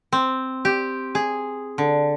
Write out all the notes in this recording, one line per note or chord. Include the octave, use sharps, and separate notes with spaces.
C4
G4
G#4
D3